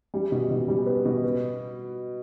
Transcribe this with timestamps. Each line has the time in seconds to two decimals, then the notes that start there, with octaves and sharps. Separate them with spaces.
0.14 G3
0.32 B2
0.51 B2
0.68 G3
0.86 B3
1.05 B2
1.24 B3